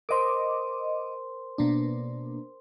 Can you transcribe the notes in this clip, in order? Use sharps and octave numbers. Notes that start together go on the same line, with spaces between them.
A#4 C5 D#5 C6 D6
B2 A#3 D4